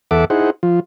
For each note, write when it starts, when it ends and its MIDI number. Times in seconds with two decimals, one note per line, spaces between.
0.11 0.25 40
0.11 0.25 69
0.11 0.25 76
0.11 0.25 78
0.11 0.25 86
0.30 0.50 63
0.30 0.50 64
0.30 0.50 68
0.30 0.50 72
0.30 0.50 78
0.63 0.80 53
0.63 0.80 65